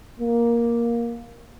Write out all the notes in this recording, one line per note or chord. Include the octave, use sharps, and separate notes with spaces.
A#3